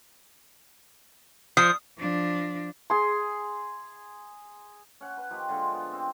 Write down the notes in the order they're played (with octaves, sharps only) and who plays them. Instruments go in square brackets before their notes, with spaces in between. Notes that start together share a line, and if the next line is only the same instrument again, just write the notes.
[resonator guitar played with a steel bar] F3 [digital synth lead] D#6
[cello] F3 D4
[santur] G#4 C6
[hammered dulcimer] C#4 F#5
B4
F3 A#3 D#4 G4
D3 G#3 F4 A4
B3
C4